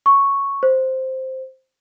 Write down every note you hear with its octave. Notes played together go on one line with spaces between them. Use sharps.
C#6
C5